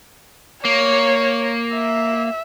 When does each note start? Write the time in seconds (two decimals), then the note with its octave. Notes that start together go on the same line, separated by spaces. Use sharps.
0.65 A#3 C#5
1.74 E5